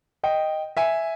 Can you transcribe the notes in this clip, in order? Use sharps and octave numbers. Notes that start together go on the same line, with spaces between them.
D#5 G5
E5 G#5